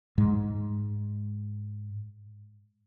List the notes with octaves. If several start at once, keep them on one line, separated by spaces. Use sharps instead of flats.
G#2 G#3